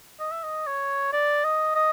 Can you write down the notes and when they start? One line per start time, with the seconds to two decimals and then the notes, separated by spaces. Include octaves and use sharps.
0.20 D#5
0.32 E5
0.44 D#5
0.67 C#5
1.13 D5
1.44 D#5
1.75 D#5